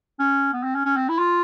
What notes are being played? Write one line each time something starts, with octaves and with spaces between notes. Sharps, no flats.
C#4
B3
C4
C#4
C#4
C4
E4
F4